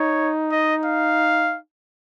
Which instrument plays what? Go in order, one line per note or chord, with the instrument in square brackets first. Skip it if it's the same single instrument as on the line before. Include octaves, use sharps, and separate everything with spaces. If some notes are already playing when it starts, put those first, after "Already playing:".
Already playing: [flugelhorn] D#4 [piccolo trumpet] C#5
[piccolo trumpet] D#5
F5